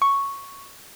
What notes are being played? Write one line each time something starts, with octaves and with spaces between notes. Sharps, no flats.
C#6